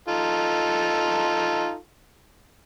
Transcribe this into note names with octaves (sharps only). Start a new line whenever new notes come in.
D#4 F4 A4